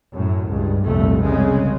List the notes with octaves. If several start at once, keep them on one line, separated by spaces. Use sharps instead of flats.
F#2 A2
C#2 G2
F1 C2 A#2 A3
C2 C#3 G#3